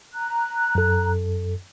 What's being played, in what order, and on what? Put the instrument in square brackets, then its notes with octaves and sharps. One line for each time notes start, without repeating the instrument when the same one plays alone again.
[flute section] A#5 F#6
[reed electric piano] F#2 A4